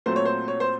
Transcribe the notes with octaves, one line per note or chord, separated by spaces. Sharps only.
A#2 F#3 A3 C4 C5
C#5
C5
C#5
C5